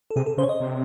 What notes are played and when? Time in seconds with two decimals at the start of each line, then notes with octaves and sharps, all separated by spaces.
0.11 A4
0.16 C3 G#4
0.26 A4
0.37 C#3 C5
0.43 C#5
0.49 D#5
0.60 C3